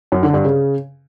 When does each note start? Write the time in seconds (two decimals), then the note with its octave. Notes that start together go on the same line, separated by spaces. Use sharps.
0.12 F#2
0.23 D3
0.34 G2
0.45 C#3